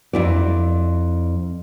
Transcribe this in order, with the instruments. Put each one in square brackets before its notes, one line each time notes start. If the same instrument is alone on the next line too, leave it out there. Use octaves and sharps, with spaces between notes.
[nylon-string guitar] F2 E4 D5